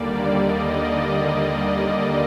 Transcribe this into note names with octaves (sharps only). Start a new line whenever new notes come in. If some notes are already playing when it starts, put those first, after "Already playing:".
Already playing: D#2 D3 G3 A#3 D5
D#5